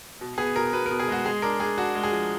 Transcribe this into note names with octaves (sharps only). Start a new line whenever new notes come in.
B2
B3 G#4
B2 A#4
B2 B4
B2 A#4
G#4
G#3 F#4
G#3 G#4
D4 A#4
D4 G#4
D4 F#4
G#3
G#4
F3